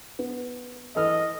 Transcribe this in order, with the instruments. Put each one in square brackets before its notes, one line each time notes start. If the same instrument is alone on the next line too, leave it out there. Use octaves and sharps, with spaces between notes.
[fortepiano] B3
[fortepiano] E3 A4 F6 [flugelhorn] D#5